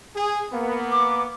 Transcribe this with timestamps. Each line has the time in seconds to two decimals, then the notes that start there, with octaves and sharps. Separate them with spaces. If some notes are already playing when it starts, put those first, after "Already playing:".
0.16 G#4
0.53 A#3 B3
0.92 D6